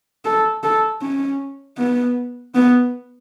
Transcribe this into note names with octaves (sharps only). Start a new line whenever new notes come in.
A4
A4
C#4
B3
B3